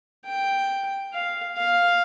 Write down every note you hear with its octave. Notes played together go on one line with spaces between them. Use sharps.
G5
F5
F5